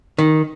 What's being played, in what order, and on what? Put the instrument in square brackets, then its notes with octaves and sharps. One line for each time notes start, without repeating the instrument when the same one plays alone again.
[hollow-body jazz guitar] D#3